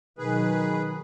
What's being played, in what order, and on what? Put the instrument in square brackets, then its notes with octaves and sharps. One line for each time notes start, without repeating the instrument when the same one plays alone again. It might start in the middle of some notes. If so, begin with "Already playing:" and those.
[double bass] B2 F#3 [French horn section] D#3 [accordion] G#4 B4